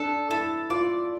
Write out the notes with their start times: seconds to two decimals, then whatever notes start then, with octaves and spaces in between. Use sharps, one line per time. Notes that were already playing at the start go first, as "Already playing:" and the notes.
Already playing: D4 A4
0.30 E4 A4
0.70 F4 D5